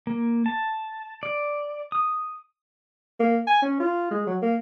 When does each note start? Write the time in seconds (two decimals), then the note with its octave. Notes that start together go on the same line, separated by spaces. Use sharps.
0.07 A#3
0.46 A5
1.23 D5
1.92 D#6
3.20 A#3
3.47 G#5
3.62 C#4
3.80 F4
4.11 G#3
4.27 F#3
4.42 A#3